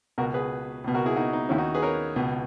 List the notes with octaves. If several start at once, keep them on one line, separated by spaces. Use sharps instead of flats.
C#2 B2 F#4 A#4
G#4 B4
C#2 B2
F#4 A#4
E4 G#4
D#4 F#4
D#4
D#2 D#3 C#4 E4
D#4 F#4
G#4 B4
A#4 C#5
C#2 B2